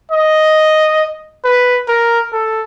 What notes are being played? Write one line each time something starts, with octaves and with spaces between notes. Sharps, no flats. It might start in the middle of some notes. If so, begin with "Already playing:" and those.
D#5
B4
A#4
A4